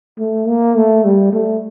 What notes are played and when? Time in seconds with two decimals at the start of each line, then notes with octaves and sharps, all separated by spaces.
0.19 A3
0.48 A#3
0.77 A3
1.05 G3
1.33 A3